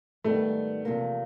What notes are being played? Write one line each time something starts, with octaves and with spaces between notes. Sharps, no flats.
G#2 D#3 G3 A3 B3
E2 C3 F3 A#3